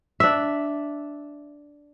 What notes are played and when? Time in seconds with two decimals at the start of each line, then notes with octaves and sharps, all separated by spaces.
0.20 D4 E5